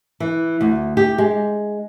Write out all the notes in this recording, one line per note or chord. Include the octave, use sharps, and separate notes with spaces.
E3
D2
G4
G#3